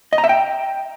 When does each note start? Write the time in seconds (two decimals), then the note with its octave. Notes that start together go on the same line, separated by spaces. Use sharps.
0.13 D#5
0.18 A#5
0.24 E5
0.29 G5